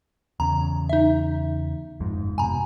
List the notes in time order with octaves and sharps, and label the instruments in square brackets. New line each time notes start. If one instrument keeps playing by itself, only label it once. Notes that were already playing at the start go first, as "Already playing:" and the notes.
[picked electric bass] E2 C#3 [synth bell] A#5
[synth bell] D#4 E5
[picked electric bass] G1 F2 G#2
[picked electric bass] F1 B2 [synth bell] G#5 A#5